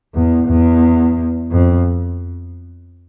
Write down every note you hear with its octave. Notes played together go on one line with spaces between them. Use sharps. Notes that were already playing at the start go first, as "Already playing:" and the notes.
E2
E2
F2